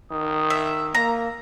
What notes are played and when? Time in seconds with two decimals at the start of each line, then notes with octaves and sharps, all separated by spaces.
0.11 D#3 D#6
0.50 E5
0.95 A#3 A#5